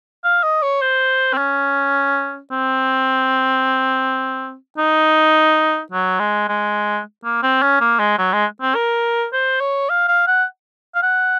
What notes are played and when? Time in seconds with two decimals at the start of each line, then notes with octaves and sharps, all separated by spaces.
0.25 F5
0.43 D#5
0.63 C#5
0.82 C5
1.33 C4
1.38 C#4
2.51 C4
4.78 D#4
5.92 F#3
6.20 G#3
6.49 G#3
7.24 A#3
7.43 C4
7.62 C#4
7.81 A#3
8.00 G#3
8.18 F#3
8.33 G#3
8.62 C4
8.75 A#4
9.33 C5
9.61 C#5
9.90 F5
10.08 F5
10.27 F#5
10.95 F5
11.03 F#5